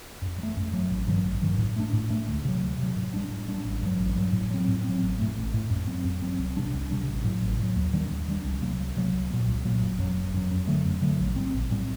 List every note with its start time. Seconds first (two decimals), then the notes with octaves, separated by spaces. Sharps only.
0.22 F#2
0.38 F#3
0.43 A3
0.56 F#2
0.73 F#3 A3
0.90 A1
1.07 G2 D#3 F#3
1.24 A1
1.42 G2 D#3 F#3
1.59 A2
1.76 A3 D4
1.93 A2
2.10 A3 D4
2.28 D2
2.45 C3 F#3
2.62 D2
2.78 C3 F#3
2.96 A2
3.14 G3 D4
3.30 A2
3.48 G3 D4
3.65 A1
3.82 G2 F#3
3.99 A1
4.15 G2 F#3
4.33 A2
4.51 F#3 C4
4.68 A2
4.84 C4
4.89 F#3
5.02 A1
5.19 A2 A3
5.37 A1
5.53 A2 A3
5.70 F#2
5.87 F#3 C4
6.04 F#2
6.22 F#3 C4
6.38 C2
6.57 C3 G3 D4
6.73 C2
6.91 C3 G3 D4
7.08 A1
7.24 A2 F#3
7.42 A1
7.58 A2 F#3
7.76 D#2
7.93 D#3 G3 D4
8.11 D#2
8.28 D#3 G3 D4
8.44 C2
8.62 C3 F#3 A#3
8.79 C2
8.97 C3 F#3 A#3
9.13 C2
9.30 A#2 F#3 A#3
9.48 C2
9.65 A#2 F#3 A#3
9.81 F#1
9.99 F#2 F#3
10.17 F#1
10.34 F#2 F#3
10.51 F#2
10.67 D3 F#3 A3
10.86 F#2
11.02 D3 F#3 A3
11.19 A#1
11.36 A2 G3 C4
11.53 A#1
11.71 A2 G3 C4